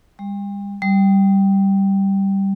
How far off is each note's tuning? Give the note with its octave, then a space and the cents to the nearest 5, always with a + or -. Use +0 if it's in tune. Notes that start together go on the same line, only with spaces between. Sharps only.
G3 +40
G3 -5